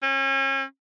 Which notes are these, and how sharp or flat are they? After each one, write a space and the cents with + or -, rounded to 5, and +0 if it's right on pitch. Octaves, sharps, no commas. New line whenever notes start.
C#4 -35